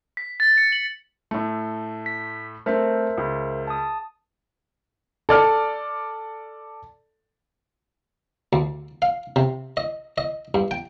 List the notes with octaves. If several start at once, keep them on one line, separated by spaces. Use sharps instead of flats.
B6
A6
C#7
F#7
A2 A3
B6
A3 C4 A#4 C5 E5
C#2
A5 D#6
A4 D5 F6
D2
F5
C3
D#5
D#5
G2
G5